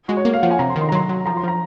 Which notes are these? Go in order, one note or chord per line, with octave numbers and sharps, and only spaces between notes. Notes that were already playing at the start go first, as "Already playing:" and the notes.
G#3 F#4
C#5
A#3
F5
F3 F#5
G#5
C3 A#5
C6
D#3
C6
A#5
F#3 C6
F#3
F3 A#5
C6
F3 A#5